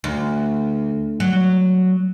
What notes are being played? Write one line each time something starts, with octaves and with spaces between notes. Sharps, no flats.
D2
F#3